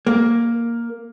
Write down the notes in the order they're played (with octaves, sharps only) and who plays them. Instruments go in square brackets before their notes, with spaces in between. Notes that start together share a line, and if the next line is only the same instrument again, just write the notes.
[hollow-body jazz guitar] A#3